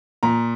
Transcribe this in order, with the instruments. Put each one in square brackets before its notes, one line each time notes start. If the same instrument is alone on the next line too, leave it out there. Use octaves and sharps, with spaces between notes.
[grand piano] A#2 A#5